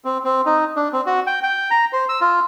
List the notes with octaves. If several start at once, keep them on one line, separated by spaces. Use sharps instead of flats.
C4
C4
D#4
D4
C4
F#4
G5
G5
A#5
C5
E6
F4